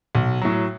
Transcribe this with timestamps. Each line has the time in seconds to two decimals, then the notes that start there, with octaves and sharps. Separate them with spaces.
0.15 B1
0.41 A2 F#3